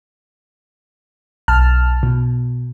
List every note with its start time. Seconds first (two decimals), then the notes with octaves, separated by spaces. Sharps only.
1.48 B1 A5 F6
2.03 B2